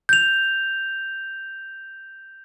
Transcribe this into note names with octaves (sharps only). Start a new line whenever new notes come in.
G6 F7